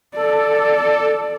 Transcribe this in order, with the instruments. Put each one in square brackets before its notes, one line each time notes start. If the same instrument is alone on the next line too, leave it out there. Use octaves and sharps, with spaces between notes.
[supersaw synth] A4 [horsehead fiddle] D5